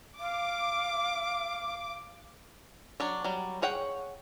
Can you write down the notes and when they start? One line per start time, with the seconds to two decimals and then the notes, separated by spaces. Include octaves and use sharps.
0.20 F5 D6
3.00 F#3 D4 C#5
3.24 F#3 G3
3.62 G#4 C#5 F#5 G5